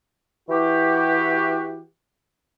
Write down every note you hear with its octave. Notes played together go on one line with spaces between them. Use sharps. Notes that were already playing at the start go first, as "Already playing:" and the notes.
E3 F#4 G4